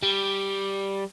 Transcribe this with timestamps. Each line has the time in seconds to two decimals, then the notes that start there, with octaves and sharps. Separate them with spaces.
0.03 G3